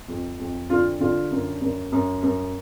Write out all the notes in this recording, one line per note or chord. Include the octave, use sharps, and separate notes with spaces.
F2
F2
D3 F4
D3 F4
F#2
F#2
F#2
F#2